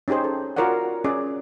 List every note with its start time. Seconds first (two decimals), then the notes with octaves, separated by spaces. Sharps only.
0.08 C#4 D#4 G4 G#4 C5
0.24 A4
0.56 F4 F#4 A#4 C#5 D5 F#5
1.04 C#4 G#4 D5